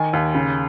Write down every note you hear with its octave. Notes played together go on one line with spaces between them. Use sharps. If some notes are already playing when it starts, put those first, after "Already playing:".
Already playing: D#3 G#5
D#2
C#3